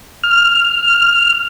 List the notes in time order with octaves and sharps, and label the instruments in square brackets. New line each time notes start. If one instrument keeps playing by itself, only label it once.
[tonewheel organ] F6